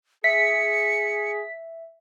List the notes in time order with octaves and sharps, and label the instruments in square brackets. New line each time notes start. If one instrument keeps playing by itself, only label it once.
[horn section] G#4 [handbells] E5 [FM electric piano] B6 [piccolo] C#7